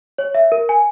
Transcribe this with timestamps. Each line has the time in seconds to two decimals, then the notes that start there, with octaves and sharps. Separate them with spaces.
0.18 C#5
0.35 E5
0.52 A#4
0.69 G#5